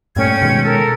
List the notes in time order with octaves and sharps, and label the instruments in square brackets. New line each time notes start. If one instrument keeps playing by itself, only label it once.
[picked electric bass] G2 A#2 A3 [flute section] C#4 G5 G#6
[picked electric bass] B2 D#3 G#3
[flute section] A4 A#4